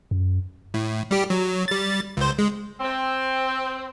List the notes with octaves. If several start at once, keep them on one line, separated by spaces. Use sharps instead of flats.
F#2
A2
G3 G4
F#3
G3 A6
C#2 C5
G#3
C4